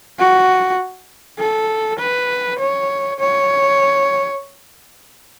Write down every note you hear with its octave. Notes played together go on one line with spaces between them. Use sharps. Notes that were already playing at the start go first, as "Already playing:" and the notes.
F#4
A4
B4
C#5
C#5